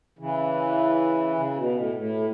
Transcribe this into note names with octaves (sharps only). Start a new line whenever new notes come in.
C#3 E3
C#3
B2
A2
A2